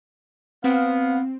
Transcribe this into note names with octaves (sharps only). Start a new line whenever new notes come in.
B3 C4 F5